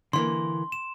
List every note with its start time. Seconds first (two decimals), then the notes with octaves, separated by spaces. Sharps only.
0.13 D3 E3 A#3 C6
0.72 E7